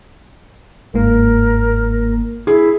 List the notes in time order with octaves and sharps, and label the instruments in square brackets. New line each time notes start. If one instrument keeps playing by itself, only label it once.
[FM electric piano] G1 G#2 A#3 [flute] A#4
[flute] E4 [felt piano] G#4